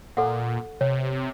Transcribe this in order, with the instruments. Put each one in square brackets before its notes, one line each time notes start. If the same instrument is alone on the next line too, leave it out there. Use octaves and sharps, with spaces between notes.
[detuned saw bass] A#2 [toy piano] A4 F#5
[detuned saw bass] C3 [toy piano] C#5